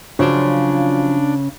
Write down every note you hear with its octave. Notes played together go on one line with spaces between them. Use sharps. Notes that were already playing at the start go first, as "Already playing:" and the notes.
C#3 F3 F#3 D4 F4